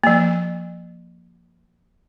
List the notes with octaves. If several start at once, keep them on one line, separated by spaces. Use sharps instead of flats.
F3 A#3